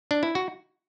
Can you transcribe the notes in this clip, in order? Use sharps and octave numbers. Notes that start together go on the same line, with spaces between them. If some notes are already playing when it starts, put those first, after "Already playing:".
D4
E4
F#4